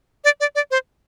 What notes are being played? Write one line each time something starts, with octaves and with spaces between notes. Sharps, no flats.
D5
D5
D5
C5